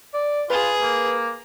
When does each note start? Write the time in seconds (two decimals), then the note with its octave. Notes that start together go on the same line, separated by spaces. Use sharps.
0.14 D5
0.50 F4 G#4 B4
0.82 A#3